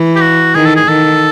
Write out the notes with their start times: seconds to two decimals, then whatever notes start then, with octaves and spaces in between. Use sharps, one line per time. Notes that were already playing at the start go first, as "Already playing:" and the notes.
Already playing: E3
0.16 G4
0.21 F#4
0.54 D#3 G#4
0.65 A4
0.76 G#4
0.87 D#3 A4